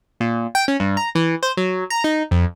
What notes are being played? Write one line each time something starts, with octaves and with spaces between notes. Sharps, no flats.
A#2
G5
C#4
G2
A#5
E3
C5
F#3
A#5
D#4
F2